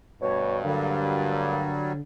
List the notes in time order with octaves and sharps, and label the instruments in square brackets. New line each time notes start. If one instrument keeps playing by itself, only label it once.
[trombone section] D2 G2 [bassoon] B2 [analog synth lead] C#5
[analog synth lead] D3 [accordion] F#3 G3 [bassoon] A#3